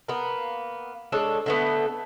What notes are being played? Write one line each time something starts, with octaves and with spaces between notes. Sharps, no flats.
A#3 B3
G#3 D4 A4 C#5
D3 A3 B3